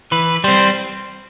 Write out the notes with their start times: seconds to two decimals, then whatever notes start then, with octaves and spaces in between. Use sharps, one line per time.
0.12 E3 B4
0.44 G3 C4 C5